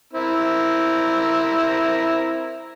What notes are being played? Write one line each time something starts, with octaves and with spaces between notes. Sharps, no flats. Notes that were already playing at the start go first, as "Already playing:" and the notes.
C4 E4 A#4